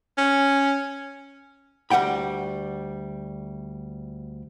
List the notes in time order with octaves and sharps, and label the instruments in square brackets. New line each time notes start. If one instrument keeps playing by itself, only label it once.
[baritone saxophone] C#4
[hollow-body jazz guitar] D2 G3 F#5 G5 B5